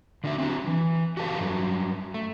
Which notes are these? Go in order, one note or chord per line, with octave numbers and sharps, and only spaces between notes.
D3 D4 F#4 E5
C4 D4 F#4
E3
F#4 G4 A4 B4 F5
G2 F#3
A3